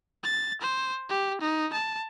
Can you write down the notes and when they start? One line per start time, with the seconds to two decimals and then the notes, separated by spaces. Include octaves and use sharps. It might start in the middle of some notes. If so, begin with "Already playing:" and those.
0.24 A6
0.61 C5
1.10 G4
1.41 D#4
1.73 A5